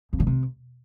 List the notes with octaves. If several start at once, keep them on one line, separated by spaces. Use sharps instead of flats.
F2
D3
C3